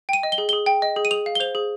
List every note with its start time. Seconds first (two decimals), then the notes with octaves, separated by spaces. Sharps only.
0.09 G5 D#7
0.23 D#5
0.32 G7
0.38 G#4
0.49 G#4 G7
0.66 G5
0.82 D#5
0.96 G#4
1.05 D#7
1.11 G#4 F7
1.26 F5
1.35 G7
1.40 C5 F7
1.55 G#4